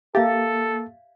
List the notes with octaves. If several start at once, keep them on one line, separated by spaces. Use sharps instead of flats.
A#3 G4 A4 E5 F5 A6